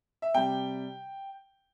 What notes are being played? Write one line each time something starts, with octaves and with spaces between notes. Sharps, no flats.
E5
C3 G3 G5